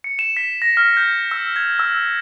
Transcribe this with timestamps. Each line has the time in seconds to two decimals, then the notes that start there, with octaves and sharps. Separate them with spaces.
0.04 C#7
0.19 E7
0.37 B6
0.62 A#6
0.77 F6
0.97 G6
1.31 E6
1.56 G#6
1.79 E6